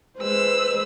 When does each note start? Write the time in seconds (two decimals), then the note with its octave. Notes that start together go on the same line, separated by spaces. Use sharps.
0.19 G#3 B4 C5 E6